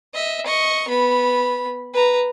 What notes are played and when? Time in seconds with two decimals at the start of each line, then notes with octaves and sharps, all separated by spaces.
0.14 D#5 E5
0.46 D#5 C#6
0.88 B3 B5
1.94 B4 A#5